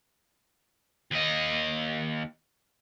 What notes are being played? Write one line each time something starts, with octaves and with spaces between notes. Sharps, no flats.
D#2 D#5